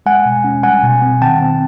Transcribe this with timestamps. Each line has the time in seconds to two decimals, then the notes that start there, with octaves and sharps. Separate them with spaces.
0.06 G#3 F#5 G#5
0.26 B2
0.44 C#4
0.63 G3 F#5 G#5
0.84 B2
1.02 C4
1.21 D#3 G5 A5
1.41 C4